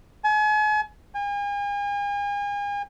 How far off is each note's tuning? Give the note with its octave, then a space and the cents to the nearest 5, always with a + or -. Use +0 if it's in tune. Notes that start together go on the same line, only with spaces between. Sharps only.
G#5 +40
G#5 -40